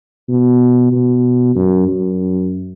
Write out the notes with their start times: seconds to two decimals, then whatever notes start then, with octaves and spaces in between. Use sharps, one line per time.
0.28 B2
0.92 B2
1.55 F#2
1.88 F#2